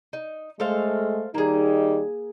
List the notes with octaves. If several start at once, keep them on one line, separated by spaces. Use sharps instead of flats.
D#4
G#3 A3 A4 C5 F5
D#3 G3 A#3 D#4 G#4